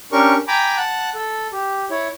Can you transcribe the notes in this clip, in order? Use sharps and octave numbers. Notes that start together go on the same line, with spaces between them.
C#4 D4 G4 A#4 C#6
G5 G#5 A#5 B5 D6
F#5 A5 F#6
A4
G4
E4 C#5